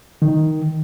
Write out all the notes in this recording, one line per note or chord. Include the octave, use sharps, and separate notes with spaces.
D#3